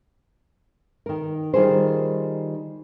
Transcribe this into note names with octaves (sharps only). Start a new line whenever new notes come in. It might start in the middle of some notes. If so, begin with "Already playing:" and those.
D#3 A#4
D#3 G3 F4 G#4 A#4 C5